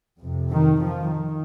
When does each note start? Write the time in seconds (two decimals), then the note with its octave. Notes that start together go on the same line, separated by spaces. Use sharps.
0.19 F2 C3
0.51 D#3
0.82 F3
1.12 D#3